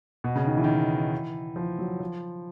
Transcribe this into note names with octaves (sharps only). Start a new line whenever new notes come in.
B2
C#3
D#3
E3
D#3
E3
F3
F#3
F3